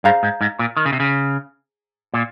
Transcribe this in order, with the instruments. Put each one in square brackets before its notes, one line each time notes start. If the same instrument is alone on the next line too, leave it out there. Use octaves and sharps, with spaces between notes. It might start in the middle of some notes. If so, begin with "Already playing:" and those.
[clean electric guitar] G2 [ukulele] G#4 C5 F5 A#5
[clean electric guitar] G#2
G#2
A#2
D#3
C#3
C3
C#3
A#2